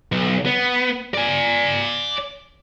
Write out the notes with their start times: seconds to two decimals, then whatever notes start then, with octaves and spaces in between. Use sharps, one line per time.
0.12 B1
0.46 B3
1.14 D5 G#5